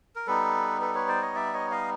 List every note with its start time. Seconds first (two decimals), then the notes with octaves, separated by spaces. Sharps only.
0.15 A#4
0.27 G3 B3 D#4 A4 B4
0.81 A4 B4
0.95 B4 C#5
1.08 C5 D5
1.22 C#5 D#5
1.35 D5 E5
1.53 C#5 D#5
1.71 D#5 F5